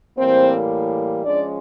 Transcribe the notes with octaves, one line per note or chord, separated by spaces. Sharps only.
A2 E3 G3 A#3 C4 C5
F3 G#3 C#4 D4 D5